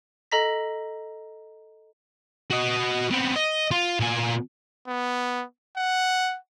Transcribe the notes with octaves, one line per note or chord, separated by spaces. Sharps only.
A4 D#5 A#5 A#6 B6
F#4 D#5
B3 C4
D#5
F4
A#2 G#5
B3
F#5